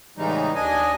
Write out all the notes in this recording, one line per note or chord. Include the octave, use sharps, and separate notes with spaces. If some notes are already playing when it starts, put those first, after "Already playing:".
A2 C#3 E3 G3 G#3 D#4
D#2 D4 D#5 G#5